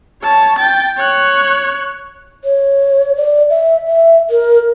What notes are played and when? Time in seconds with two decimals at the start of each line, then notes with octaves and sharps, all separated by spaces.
0.23 C#5 A5
0.59 G5 A6
0.98 C#5 F#6
2.44 C#5
3.16 D5
3.50 E5
3.88 E5
4.30 A#4